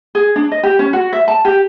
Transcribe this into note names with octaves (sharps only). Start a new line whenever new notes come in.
G#4
D4
D#5
G4
C#4
F#4
E5
A5
G4